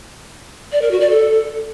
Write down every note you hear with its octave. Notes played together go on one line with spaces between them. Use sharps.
D5
A#4
F#4
D5
A4